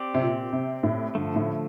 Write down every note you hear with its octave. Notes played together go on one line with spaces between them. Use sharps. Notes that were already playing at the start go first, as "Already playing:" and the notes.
Already playing: C4 G4 D5
C3
A#2
C3
A2
G2 D3 F3 A3
A2